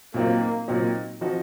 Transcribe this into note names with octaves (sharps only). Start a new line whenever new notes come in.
A#2 F#3 A#3 C4 D#4
A#2 F#3 C4 D#4
F3 C4 D#4 F#4